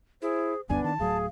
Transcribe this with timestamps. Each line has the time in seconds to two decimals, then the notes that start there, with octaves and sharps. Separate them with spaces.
0.22 E4 G#4 C5
0.69 F#1 D2 G2 B3 D4 G#5
0.84 D#3 A5
0.99 D1 A2 F#3 G#4 F5